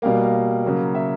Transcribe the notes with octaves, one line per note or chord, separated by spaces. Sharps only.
B2 G3 A#3 F5
F5
C#3 F#3 A#3
E5